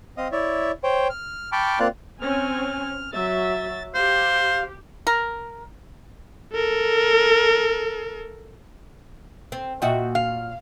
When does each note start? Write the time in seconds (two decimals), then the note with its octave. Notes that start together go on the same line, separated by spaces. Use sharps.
0.17 C4 D#5 F5 D#6
0.32 E4 C#5 D5 E5
0.84 C5 C#5 G5
1.10 F6
1.52 G5 A5 B5 C#6 D6 F6
1.80 A#3 C4 F4 D5 F5 F#6
2.21 C4 C#4 G#5 F6
3.12 F#3 E5 A6
3.94 G4 C5 F5
5.07 A#4
6.53 A4 A#4
9.52 C4
9.82 A#2 F#4 D#5 E5 G5
10.15 F5 F6